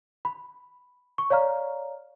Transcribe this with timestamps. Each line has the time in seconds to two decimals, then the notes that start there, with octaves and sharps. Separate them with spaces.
0.25 B5
1.18 C#6
1.30 C#5 D5 F5 A#5 F6